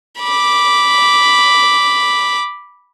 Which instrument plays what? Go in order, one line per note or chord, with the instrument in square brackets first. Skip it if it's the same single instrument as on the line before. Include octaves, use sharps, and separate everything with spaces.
[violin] B5 D6